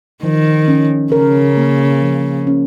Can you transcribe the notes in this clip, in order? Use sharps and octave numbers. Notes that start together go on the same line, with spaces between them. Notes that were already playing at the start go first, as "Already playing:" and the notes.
D#3 F3
C#4
C#3 A#4
A#3
F3
C#4